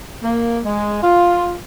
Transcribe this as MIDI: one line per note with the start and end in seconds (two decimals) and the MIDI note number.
0.22 0.59 58
0.65 0.99 56
1.02 1.54 65